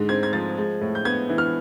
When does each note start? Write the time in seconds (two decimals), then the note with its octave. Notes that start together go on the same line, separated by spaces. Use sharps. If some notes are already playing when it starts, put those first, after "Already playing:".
Already playing: G#2 D3 G#3
0.09 C4 G#6
0.23 G#6
0.33 F3 A6
0.57 G#3
0.81 A2
0.95 G6
1.05 B3 G#6
1.29 E3
1.38 F6